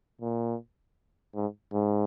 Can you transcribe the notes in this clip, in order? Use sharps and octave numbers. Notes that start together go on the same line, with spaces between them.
A#2
G#2
G#2